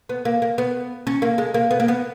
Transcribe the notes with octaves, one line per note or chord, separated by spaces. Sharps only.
B3
A#3
A#3
B3
C#4
A#3
G#3
A#3
B3
A#3
B3